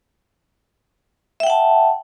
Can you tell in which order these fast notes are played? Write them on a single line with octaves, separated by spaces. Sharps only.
E5 G5 F#5 A5